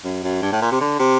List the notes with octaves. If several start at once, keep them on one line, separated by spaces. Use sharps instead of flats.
F#2
F#2
G2
A2
A#2
C3
D3
C3